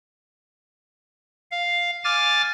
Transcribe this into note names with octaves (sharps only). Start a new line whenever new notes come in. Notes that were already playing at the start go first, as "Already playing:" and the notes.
F5
G#5 D6 F6 A6